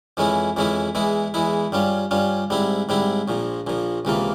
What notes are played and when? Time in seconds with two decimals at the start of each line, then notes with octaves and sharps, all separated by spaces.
0.17 F2 E3 G#3 C#4 E4
0.56 F2 E3 G#3 C#4 E4
0.95 E2 E3 G#3 E4
1.34 E2 E3 G#3 E4
1.72 G2 G3 C#4 F4
2.11 G2 G3 C#4 F4
2.50 G#2 G3 C4 E4
2.89 G#2 G3 C4 E4
3.28 A#1 A#2 F3
3.67 A#1 A#2 F3
4.05 C#2 C3 E3 A#3 F4